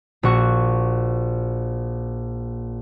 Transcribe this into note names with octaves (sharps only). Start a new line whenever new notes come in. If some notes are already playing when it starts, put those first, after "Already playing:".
A#1 F#4 C#6